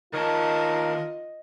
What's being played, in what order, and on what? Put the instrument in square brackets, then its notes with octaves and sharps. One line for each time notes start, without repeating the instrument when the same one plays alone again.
[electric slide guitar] D#3 C#5 A5 [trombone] F4 [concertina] A#4 [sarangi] D#5